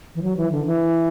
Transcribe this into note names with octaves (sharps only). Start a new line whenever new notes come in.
E3
F#3
E3
D3
E3